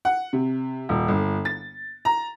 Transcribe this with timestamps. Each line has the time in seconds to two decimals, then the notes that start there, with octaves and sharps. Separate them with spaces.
0.05 F#5
0.33 C3
0.89 D#1
1.08 G1
1.45 A6
2.05 A#5